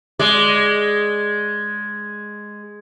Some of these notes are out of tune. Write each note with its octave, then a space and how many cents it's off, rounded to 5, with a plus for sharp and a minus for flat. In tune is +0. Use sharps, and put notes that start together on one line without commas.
G#3 +0 D5 +0